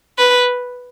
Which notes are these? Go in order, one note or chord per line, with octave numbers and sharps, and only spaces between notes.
B4